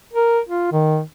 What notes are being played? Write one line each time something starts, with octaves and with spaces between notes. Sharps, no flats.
A#4
F4
D#3